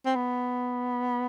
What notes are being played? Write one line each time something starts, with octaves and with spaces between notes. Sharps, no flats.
C4
B3